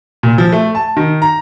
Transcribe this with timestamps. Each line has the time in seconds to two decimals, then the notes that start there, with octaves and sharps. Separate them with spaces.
0.23 A#2
0.38 F3
0.52 A3
0.75 A5
0.97 D#3
1.22 A#5